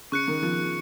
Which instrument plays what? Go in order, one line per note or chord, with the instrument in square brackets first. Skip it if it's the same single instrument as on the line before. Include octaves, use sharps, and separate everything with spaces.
[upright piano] C#3 [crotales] C#6 F#6 C#7
[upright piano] D#3
F3